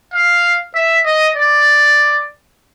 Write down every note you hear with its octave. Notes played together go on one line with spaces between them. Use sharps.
F5
E5
D#5
D5